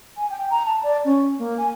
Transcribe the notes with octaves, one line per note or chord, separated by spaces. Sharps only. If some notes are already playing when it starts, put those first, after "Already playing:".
G#5
G5
A#5
A5
D5
C#4
A#3
G#5